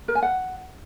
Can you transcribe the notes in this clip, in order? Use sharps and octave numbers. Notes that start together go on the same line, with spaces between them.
A#4
G#5
F#5